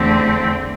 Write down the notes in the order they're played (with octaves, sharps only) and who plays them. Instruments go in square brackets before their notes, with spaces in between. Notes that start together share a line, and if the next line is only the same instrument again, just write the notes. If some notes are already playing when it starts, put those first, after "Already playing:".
Already playing: [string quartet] E2 D3 A3 C4